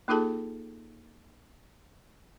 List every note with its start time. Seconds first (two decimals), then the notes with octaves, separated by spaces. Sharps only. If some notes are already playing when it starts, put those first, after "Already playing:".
0.08 A#3 D#4 F4 G#4 A4 A5